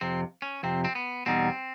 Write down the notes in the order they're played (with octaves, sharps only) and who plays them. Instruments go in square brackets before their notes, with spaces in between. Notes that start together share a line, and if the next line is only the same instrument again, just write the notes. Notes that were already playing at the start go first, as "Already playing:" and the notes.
[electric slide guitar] F2 C3 [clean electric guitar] C4
[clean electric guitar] C#4
[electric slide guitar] F2 C3 [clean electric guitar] C4
[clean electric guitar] C4
B3
[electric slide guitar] E2 B2 G3 B3 D#4 [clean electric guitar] C4